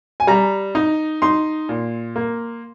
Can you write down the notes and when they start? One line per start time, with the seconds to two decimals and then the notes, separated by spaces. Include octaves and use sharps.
0.20 G#5
0.27 G3 A#5
0.75 D#4
1.22 D#4 C6
1.69 A#2
2.16 A#3